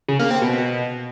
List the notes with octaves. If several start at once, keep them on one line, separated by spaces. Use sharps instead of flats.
C#3
A#3
C4
B2